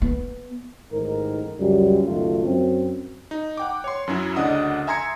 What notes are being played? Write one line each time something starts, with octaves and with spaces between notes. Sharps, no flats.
B3
A1 G#2 D#3 A#4
C#2 F#2 G3
C#2 F#2 D#3 A3 F4
F#2 C4
D#4
F#5 G5 D6
C#5 C6
F#2 F#3 C#4 E4
D2 C#3 D4 D#5 F#5 D#6
E5 G#5 A#5 C6 G#6 C#7